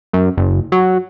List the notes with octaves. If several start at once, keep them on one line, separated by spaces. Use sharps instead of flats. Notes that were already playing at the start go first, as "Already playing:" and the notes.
F#2
F#1
F#3